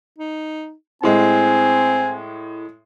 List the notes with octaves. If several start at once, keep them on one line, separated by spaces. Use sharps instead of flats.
D#4
A2 G#3 C4 G#5